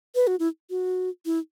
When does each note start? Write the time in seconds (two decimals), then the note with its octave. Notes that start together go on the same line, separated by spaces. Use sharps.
0.15 B4
0.27 F#4
0.39 E4
0.70 F#4
1.26 E4